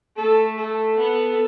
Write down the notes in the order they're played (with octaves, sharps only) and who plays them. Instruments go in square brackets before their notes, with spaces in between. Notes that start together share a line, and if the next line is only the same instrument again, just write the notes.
[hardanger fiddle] A3 [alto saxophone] A4
[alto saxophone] A4
[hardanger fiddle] B3